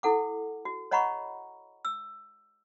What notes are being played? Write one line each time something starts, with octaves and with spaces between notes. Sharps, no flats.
E4 A4 F#5 D6
F#4
C#5 D#5 F#5 A#5 B5 C#6
E6